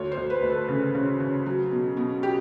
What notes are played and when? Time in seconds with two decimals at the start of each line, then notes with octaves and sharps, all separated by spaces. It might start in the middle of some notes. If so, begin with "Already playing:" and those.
Already playing: D2 C#5
0.12 C5
0.17 D2
0.30 B4
0.43 D2
0.50 A4
0.68 C#3
0.95 C#3
1.20 C#3
1.46 F#3
1.71 B2
1.97 B2
2.23 G4